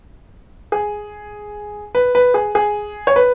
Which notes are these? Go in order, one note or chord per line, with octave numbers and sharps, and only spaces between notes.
G#4
B4
B4
G#4
G#4
C#5
B4